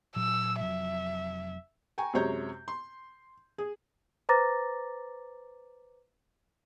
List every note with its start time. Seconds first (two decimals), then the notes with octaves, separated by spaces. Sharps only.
0.16 A#2 F#3 E6
0.60 F1 F#3 E5
1.98 G5 G#5 A#5 C#6
2.13 F#2 C3 G#3 C#5 A#5 G6
2.68 C6
3.58 G#4
4.29 B4 C5 A#5 D6 A6 A#6